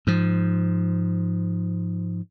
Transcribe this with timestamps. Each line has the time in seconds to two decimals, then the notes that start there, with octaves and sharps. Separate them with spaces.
0.07 G#2 F3